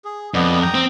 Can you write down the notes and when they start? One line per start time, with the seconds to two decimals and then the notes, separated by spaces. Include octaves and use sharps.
0.05 G#4
0.34 F2 B3 D5 D#5
0.62 G5 A#5 D#6
0.74 C4